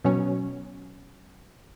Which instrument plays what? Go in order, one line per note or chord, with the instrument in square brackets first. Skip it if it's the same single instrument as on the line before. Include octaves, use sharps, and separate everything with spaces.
[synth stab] B2 F#3 C#4